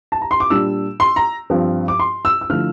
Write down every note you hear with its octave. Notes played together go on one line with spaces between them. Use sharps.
A5
A#5
C6
D6
A#2 G3 D4 E6
C6
A#5
G2 F3 C4
D6
C6
E6
E6
D3 F3 A3 E4 F6